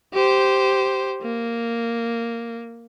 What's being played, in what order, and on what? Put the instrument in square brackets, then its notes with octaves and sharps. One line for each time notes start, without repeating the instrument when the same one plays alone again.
[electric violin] G4 C5
A#3